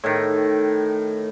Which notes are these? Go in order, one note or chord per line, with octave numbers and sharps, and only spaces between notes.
A2 D#3